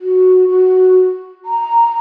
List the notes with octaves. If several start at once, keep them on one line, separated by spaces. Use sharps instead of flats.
F#4
F#4
A#5